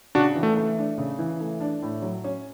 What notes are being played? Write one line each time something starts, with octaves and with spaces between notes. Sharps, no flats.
C#3 D4 F#4
E3
A3
A3
D4
C#3
E3
A3
D4
A2
F#3
C#4